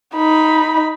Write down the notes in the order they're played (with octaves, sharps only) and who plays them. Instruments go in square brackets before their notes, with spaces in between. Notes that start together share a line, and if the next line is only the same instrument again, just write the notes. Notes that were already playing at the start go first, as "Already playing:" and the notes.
[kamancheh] D#4 B5